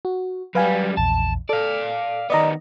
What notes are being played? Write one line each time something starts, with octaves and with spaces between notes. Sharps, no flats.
F#4
F#2 G3 B4 F5 G#5
A#1 E2 A5
A4 D5 F5
D#3 B3 D5 D#5 A#5